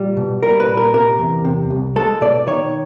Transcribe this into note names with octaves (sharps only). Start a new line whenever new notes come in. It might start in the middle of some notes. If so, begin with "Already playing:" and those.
Already playing: A#2 G3
B2
G3 A#4
B4
A#2
A#4
C3 A#4
E2
C3
C2
G#3 A4
B2 D5
D#3 C#5